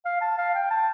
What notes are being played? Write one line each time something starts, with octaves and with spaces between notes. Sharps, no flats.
F5
A5
F5
G5
A5